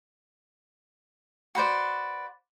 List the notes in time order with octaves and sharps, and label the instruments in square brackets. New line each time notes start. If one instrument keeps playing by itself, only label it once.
[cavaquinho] F#4 B4 C5 D5